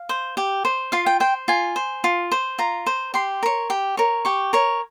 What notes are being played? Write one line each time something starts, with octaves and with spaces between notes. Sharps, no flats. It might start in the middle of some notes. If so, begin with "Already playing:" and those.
Already playing: F5
C5
G4
C5
F4 F5
G5
C5 G5
F4 G#5
C5
F4
C5
F4 A#5
C5
G4 C6
A#4 C#5
G4
A#4 C#5
G4 C#6
A#4 C#5